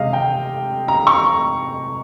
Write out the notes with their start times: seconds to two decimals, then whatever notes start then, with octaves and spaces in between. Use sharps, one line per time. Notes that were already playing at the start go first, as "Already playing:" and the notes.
Already playing: C3 G#3 D#5 F5
0.13 G5
0.88 A#5
1.07 C#6